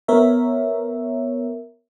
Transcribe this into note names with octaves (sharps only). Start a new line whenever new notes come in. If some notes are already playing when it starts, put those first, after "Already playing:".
B3 A#4 C#5 E5